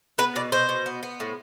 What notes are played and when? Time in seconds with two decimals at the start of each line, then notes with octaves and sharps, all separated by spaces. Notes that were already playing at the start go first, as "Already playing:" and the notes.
0.18 B3 B4
0.36 B2 D5
0.52 B2 C5
0.69 B2
0.86 B3
1.03 B3
1.20 A2